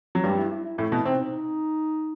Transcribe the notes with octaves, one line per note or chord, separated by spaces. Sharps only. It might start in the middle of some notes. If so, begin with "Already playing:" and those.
F#3
G2 G3 C4
E4
E4
E4
A2 A3 E4
B2 B3
C3 C4 D#4